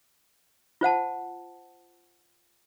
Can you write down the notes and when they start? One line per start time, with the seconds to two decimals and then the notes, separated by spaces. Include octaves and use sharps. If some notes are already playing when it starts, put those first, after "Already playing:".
0.81 F4 C5 F#5 A5